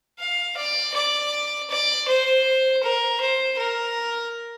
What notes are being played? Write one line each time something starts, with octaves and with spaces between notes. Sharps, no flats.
F5
D5
D5
D5
C5
A#4
C5
A#4